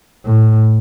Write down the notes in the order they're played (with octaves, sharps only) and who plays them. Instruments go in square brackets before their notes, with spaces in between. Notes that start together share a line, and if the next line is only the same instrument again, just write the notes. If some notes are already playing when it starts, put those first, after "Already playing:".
[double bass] A2